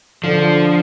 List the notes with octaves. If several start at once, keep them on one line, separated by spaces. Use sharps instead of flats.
D3 F3